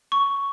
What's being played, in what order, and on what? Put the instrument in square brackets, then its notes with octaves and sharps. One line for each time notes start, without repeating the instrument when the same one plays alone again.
[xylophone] C#6